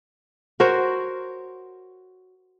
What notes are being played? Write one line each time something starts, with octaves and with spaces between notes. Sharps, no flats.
F#4 A#4 C5 C#5